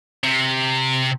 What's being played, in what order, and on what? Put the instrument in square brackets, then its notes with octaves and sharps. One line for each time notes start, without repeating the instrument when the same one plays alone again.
[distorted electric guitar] C3